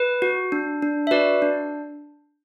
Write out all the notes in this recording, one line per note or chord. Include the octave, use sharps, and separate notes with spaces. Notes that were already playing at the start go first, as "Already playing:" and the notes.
Already playing: B4
F#4
D4
D4
E5
F#4 B4 D5
D4